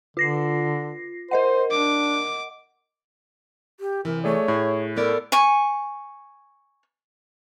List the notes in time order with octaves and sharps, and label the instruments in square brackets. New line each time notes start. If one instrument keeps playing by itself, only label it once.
[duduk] D3 [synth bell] F4 A#6 C7
[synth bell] A#4 D#5 F#5 [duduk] C5
[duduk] D4 [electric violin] D6
[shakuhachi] G4
[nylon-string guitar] C3 E3 [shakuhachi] A#4
[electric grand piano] A3 G#4 D5 [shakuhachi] C#5
[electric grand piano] A2 [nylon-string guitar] G#4
[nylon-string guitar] B3 A#4 D5 [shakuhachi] A4
[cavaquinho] G#5 C#6